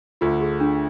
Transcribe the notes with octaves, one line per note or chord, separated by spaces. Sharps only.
D2 D3 F4
G#4
D4